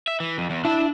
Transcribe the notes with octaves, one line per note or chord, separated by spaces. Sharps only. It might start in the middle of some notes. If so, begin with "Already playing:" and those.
E5
E3
F2
E2
D4 E4 A5